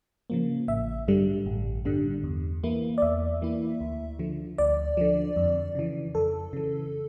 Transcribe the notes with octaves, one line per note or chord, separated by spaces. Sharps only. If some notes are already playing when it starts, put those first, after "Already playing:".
C#3 F3 A#3
A1 E5
G2 D3 G3
A1
G2 D3 G3
E2
E3 A#3 E4
D5
E2 E5
E3 A#3 E4
D2
D3 F3
D2 D5
D3 F3
F2
C#3 E3
F2 A4
C#3 E3